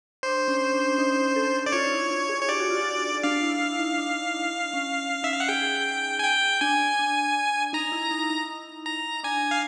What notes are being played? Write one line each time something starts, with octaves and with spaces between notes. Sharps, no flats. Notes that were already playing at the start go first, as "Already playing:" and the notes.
D4 C5
C#4
D4
D#4
A4
D5
F4 C#5
D#4
E4
D4
G#4
C#5
G4 D5
F#4
F4
F#4
D4 F5
E4
E4
D#4
D4
C#4
D#4 E5
F5
F#5
G#4 G5
G#5
G5
D4 G#5
D4
D#4 A#5
E4
D#4
D#4
A#5
D4 G#5
F5